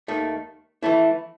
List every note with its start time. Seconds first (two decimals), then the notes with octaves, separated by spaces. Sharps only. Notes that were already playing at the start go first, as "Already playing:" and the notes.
0.08 D#2 D#3 A3
0.83 E3 A3 E4